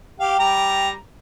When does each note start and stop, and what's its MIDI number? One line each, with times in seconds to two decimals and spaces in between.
0.20 0.38 67
0.20 0.38 77
0.20 0.89 79
0.39 0.92 55
0.39 0.92 82